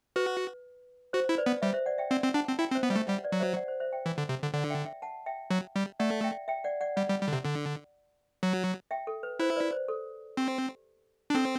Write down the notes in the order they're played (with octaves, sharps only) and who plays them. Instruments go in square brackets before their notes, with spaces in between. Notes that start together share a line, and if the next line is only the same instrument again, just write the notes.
[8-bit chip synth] F#4 [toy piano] B4
[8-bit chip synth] F#4 [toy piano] C5
[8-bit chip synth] E4
[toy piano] B4 D5
[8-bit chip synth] B3
[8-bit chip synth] G3 [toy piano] C5 E5
[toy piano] C5 E5
D5 F#5
E5 G5
[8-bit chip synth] C4 [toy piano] D5 F#5
[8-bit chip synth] C4
[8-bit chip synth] D4 [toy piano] F#5 A5
[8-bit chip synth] C4
[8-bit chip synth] E4 [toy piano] E5 G5
[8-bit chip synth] C4
[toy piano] C5 E5
[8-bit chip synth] B3
[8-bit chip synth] G3 [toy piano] C5 E5
[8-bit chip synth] A3
[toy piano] E5
[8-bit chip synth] G3 [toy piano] D5 F#5
[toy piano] B4 D5
[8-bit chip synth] F#3
[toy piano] C5 E5
D5 F#5
C5
C5 E5
E5 G5
[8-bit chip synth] E3
D3
C3
D3
[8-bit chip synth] D3 [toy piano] D5 F#5
[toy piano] E5 G5
E5 G5
F#5 A5
E5 G5
[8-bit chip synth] F#3
G3
[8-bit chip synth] A3 [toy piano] D5 F#5
[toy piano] E5 G5
E5 G5
D5 F#5
D5 F#5
[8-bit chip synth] G3 [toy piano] D5 F#5
[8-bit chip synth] G3
G3
D3
C3
D3
F#3
[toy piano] E5 G5
A4
B4
[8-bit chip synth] E4 [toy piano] C5
[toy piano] B4 D5
C5
A4
[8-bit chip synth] C4 [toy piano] G4
[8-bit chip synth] D4
[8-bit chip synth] C4 [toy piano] A4